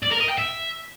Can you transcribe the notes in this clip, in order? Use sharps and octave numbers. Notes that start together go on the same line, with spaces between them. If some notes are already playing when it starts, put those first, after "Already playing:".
D5
A#4
D#5
G5
E5